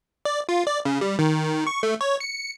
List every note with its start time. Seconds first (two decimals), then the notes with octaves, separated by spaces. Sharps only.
0.25 D5
0.49 F4
0.67 D5
0.85 C#3
1.01 G3
1.19 D#3
1.67 C#6
1.83 A3
2.01 C#5
2.20 C#7